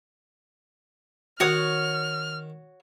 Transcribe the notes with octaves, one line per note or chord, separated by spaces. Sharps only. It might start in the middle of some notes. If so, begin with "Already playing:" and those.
D#3 F#4 C#5 D#6 F6